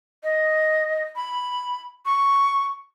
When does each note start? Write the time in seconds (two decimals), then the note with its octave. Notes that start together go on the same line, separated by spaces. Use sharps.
0.24 D#5
1.16 B5
2.06 C#6